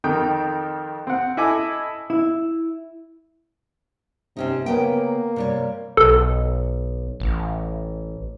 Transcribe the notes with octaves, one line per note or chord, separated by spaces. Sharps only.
F2 D#3 G5
C4 F#5
E4 A4 D#5 G#5 D6
E4
C3 C4 C#4 D#4
C#3 A#3 B3 G5
C3 G3 C#5
B1 A4
A1